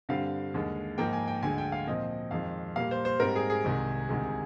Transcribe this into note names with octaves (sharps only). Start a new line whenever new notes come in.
G2 D3 G3 C4 F5
D#2 D3 G#3
G#2 F3 A#3 G5
G#5
G5
D2 D3 G#3 G#5
G5
F5
A#2 F3 C4 D#5
F2 D#3 G#3 C4 F5
A#2 G3 A#3 F5
C5
C5
G#2 G3 C4 A#4
G#4
G#4
C2 C3 D#3 G#3
D2 C3 D#3 G#3